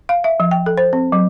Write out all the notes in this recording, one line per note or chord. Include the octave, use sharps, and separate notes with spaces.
F5
E5
F3
G5
A4
C5
C4
F#3